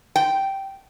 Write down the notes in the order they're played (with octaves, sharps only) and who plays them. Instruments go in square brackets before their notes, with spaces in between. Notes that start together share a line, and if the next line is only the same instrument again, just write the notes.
[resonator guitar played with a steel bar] G5